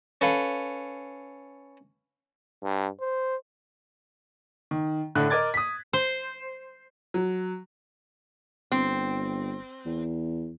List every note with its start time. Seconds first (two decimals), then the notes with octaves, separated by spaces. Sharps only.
0.21 C#4 A4 B4 F5
2.63 G2
3.00 C5
4.71 D#3
5.15 A2 D3 F#6
5.30 A#4 D#5 D6 G#6 A6
5.54 D#6 B6
5.93 C5
7.14 F#3
8.72 G1 C4
9.86 E2